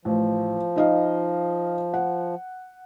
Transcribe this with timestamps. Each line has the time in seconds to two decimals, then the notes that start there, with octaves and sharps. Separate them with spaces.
0.05 A1 F3
0.76 D#4 D#5 F5
1.94 F#5